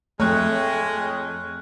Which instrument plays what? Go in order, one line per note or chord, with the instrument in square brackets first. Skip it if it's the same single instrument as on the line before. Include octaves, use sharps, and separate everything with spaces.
[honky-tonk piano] F2 C#5 [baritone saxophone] G#3 [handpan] A3 [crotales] F6 F#6